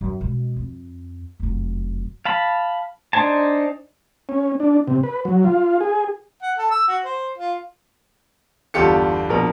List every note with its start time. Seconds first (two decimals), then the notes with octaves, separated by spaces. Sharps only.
0.01 F#2
0.21 B2 G#3
0.56 F2
1.40 F1 F#2
2.25 F5 A5 B5
3.13 D4 D#4 C5 G#5 A5
4.29 C#4
4.60 D4
4.88 C3
5.03 B4
5.25 F#3
5.44 F4
5.81 G#4
6.42 F#5
6.58 A4
6.71 E6
6.88 F#4
7.05 C5
7.38 F4
8.74 G1 E2 F4 G4 A4 C#7
9.29 A#1 B2 A#4